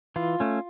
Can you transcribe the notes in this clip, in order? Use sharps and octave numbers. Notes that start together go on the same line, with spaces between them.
E3 F4
A3 C#4